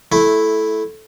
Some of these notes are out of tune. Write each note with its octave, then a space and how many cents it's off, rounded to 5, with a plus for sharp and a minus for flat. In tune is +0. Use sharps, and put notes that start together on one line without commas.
A3 -15 E4 +0